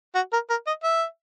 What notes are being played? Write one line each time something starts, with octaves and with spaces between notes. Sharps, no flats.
F#4
A#4
A#4
D#5
E5